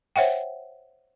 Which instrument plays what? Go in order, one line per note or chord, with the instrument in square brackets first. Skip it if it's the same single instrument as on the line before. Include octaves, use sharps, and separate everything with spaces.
[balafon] C5 C#5 E5 F#5 G5